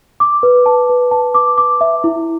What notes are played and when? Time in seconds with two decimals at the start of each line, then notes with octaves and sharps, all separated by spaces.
0.20 D6
0.43 B4
0.66 A5
0.90 B4
1.11 A5
1.34 D6
1.58 D6
1.81 E5
2.04 E4